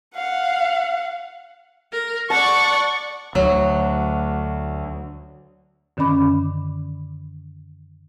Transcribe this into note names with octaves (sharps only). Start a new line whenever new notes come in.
F5 F#5
A#4
D5 F#5 A5 C#6
D2 F#3
F#2 D3 D#3 C#4 B5 D6